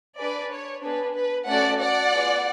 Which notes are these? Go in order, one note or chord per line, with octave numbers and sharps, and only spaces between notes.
D4 G#4 B4 D5
C#5
B3 D4 G#4 B4
B4
A3 C#4 F#4 A4 D5 F#5
D5 F#5
B3 F4 G#4